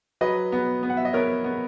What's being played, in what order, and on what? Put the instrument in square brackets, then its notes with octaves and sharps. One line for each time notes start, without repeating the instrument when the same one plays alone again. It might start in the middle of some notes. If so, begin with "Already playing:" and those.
[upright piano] F#3 [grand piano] B4 D#5
[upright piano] B3
B3
[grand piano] F#5
E5
D#5
[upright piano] B3 [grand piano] A#4 C#5
[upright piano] B3